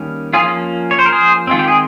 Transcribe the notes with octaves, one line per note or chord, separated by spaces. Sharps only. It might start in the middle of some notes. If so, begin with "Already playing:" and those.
Already playing: D#3 G3 A#3 C#4
F3 A#3 C#4 F4 G#4
C#5
C5
A#4
G#4 C5
D#3 G#3 C4 F4
G4
G#4